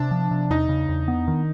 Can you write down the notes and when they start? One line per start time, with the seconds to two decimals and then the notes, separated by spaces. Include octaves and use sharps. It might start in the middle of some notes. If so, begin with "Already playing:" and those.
Already playing: C3 D4
0.11 F3
0.31 C3
0.50 E2 D#4
0.69 C#3
0.88 E2
1.08 B3
1.28 D#3